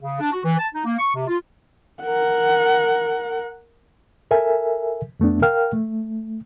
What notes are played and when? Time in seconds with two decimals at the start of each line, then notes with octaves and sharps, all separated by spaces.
0.02 C#3
0.20 D4
0.32 F#4
0.44 E3
0.57 A5
0.73 D#4
0.85 A#3
0.98 C#6
1.13 C3
1.27 F4
2.03 A#4 F#5
4.31 A4 A#4 E5 G#5
5.20 F2 A3 B3 D4
5.42 A#4 F5 G5 F6
5.73 A3